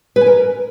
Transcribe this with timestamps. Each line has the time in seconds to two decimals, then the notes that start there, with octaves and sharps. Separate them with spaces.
0.16 B4
0.21 G#5
0.26 A#4